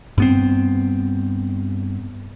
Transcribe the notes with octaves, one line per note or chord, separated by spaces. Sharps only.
G2 B3 C4